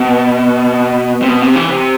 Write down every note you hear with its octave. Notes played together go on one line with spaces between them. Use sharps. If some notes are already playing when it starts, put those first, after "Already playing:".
Already playing: B2
C3
B2
C3
E3
C3